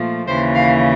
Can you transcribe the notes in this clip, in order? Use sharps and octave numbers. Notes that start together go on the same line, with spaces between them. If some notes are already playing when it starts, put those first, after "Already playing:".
Already playing: A#2 F3 A3
D#2 C#3 E3 C5
F5